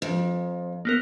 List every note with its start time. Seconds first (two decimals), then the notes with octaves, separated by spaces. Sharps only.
0.02 F2
0.85 A#3 B3 A#4